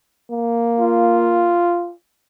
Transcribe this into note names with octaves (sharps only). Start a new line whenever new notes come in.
A#3
F4